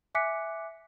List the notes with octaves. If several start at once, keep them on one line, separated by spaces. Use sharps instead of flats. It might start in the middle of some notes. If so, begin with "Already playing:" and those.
E5 G#5 D6 F#6 B6 C#7